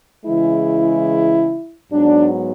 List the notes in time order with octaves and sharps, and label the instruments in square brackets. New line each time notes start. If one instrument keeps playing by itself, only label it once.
[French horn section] C#3 E3 G#3 E4
G#2 F#3 B3 D4